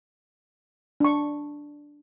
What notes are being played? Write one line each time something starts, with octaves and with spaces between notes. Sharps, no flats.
D4 C#6